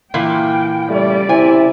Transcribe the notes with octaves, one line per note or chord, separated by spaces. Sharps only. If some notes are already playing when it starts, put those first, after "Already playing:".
A#2 E3 A#3 G5
C#3 G3 A3 D5
C3 E4 G#5